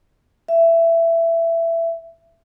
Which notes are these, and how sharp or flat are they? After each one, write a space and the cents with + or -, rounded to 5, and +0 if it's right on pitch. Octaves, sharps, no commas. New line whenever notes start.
E5 +15